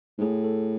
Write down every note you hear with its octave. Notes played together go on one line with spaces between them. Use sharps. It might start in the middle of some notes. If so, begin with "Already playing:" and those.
G#2
A2 G#4
A4